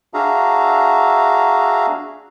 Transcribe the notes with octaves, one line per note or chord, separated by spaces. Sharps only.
D4 F#4 G#4 E5 F5 A#5